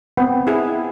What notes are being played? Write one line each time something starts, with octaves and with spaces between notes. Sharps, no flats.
B3 C4
E4 G#4